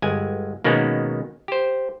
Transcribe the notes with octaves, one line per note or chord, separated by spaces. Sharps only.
G1 G#3 G#5
B2 D#3 G#3 A#3 B3 C#4
G4 C5